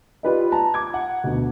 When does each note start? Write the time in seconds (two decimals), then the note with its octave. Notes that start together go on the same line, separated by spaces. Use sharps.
0.23 F4 G4 B4 D5 D#5
0.52 A5 A#5
0.74 D6 G#6
0.94 F#5
1.24 D2 B2